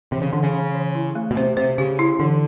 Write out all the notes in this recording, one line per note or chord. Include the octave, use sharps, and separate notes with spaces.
C3 E3
C#3
D3 E3
C#3
E3
E3
E4
A3
B2
C3 C5
C3 C5
C#3 G4
E4
D3 E3